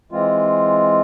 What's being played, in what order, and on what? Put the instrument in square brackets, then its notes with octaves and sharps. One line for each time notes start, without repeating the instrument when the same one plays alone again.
[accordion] E3 G#3 C4 F4